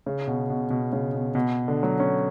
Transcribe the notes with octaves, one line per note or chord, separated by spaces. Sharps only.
C#3
B2
B2
B2
C#3
B2
B2
D3
F#3
C#4